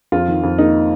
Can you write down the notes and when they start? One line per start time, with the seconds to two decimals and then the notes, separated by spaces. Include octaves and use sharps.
0.12 F2 F4
0.28 D#3
0.43 F2
0.58 A#3 D#4